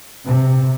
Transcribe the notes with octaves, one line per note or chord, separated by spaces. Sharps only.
C3